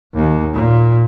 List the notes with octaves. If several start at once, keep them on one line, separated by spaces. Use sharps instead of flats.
D#2
A#2